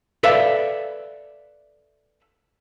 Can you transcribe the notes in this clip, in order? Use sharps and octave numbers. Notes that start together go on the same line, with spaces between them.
A4 B4 D5 E5 F5